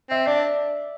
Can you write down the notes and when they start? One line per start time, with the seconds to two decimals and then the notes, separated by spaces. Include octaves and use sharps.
0.10 C4 E5
0.26 D4 D5